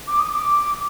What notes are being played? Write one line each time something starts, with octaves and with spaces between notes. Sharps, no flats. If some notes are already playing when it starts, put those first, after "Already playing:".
D6
D#6
D6